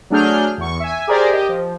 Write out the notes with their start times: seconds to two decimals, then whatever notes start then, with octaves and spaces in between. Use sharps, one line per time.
0.10 F#3 A3 D4 G#4 F6 G6
0.58 E2 C#6
0.80 E5 G#5
1.07 G4 G#4 A#4 C5 D5
1.32 G4 D#5
1.49 F3